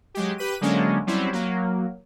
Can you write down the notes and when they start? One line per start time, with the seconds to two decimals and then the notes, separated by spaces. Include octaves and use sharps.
0.14 F#3 G#3 G4
0.38 G4 B4 B6 D#7
0.61 D3 F#3 G#3 A#3 C#4 D4
1.07 F#3 G3 C4 C#4 E4
1.33 F#3 A#3